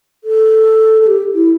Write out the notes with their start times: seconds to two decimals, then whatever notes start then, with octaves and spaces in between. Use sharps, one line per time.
0.24 A4
1.02 A4
1.07 G4
1.34 E4